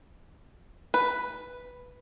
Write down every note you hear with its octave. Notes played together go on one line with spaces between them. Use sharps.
B4